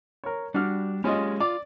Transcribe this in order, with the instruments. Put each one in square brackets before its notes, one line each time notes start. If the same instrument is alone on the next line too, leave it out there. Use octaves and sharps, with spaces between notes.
[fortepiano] A#4 C#5
[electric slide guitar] G3 [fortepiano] D4 F#4 F6
[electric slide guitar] G#3 G4 G#4 [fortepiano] C#4 F4 D#5
[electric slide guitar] F4 [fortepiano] D5